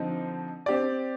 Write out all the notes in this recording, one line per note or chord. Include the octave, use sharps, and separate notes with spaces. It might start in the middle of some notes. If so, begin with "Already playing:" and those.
Already playing: D3 F3 C4 D#4
C4 G4 D5